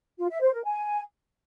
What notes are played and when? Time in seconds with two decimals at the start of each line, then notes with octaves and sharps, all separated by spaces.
0.18 F4
0.30 E5
0.41 C5
0.53 A#4
0.64 G#5